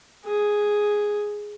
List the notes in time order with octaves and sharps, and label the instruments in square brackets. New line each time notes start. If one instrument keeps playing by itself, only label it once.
[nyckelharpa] G#4